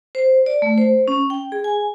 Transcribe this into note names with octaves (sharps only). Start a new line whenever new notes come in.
C5
D5
A3
C5
C#4
G5
G#4
G#5